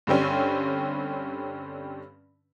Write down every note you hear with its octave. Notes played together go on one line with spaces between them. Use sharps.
G2 D3 G3 C4 C#4